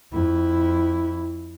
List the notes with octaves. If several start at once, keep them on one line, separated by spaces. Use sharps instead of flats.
F2 E4